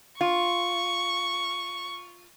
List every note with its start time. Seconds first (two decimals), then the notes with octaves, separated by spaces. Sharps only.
0.21 F4 C#6